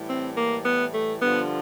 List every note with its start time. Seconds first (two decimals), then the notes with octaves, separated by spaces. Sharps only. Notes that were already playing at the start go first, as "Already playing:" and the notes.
Already playing: A2 E3 G3
0.08 C4
0.37 A#3
0.65 B3
0.93 A3
1.22 G2 D3 F3 B3